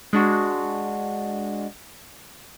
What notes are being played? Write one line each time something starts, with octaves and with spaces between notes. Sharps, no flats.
G#3 D4 F#4